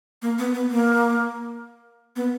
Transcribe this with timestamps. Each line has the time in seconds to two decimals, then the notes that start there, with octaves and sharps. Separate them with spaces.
0.22 A#3
0.38 B3
0.54 B3
0.71 A#3
2.16 B3